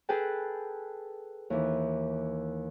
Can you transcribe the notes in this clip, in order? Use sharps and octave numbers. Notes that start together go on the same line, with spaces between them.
G#4 A4 B4 G5 A5
D#2 E3